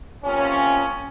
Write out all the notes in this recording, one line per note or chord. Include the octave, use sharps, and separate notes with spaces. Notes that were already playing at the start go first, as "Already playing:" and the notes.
C3 F3 A#3 C#4